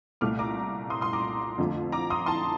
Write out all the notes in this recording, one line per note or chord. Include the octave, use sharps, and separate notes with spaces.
C2 A#2 A3 D6 F6
A#5 D6
C6 D#6
C6 D#6
A#5 D6
F2 D3 F3 A3
A#5 D6
C6 D#6
A5 C6